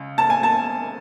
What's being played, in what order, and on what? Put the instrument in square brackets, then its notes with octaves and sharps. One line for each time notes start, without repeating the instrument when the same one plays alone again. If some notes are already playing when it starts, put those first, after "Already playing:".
Already playing: [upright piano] C#2
A5
G#5
A5